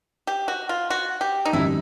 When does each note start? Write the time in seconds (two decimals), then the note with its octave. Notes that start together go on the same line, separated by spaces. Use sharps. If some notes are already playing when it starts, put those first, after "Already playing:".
0.27 G4
0.48 F#4
0.69 F4
0.90 F#4
1.21 G4
1.45 D#4
1.53 G#1 F#2 D#3 G3 E4